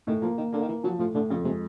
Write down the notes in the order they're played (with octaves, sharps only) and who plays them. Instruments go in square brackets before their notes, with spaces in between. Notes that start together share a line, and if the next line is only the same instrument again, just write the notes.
[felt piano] A2 [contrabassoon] D#3
[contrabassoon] F3 [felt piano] A#3
[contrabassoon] D#3 [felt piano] A#3
[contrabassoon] D3 [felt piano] A#3
[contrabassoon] D#3
[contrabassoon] E3 [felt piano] A#3
[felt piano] F3 [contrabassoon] F#3
[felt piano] A2 [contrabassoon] F3
[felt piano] A2 [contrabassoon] D3
[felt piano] F2 [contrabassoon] C#3
[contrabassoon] C3 [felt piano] G#3